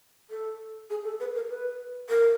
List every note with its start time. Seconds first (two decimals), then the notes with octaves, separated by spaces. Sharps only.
0.30 A4
0.90 G#4
1.04 A4
1.20 B4
1.35 A#4
1.49 B4
2.09 A#4